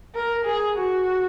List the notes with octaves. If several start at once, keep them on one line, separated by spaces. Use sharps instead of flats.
A#4
G#4
F#4